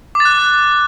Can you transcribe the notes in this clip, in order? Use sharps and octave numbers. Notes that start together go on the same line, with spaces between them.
D6
A6
F#6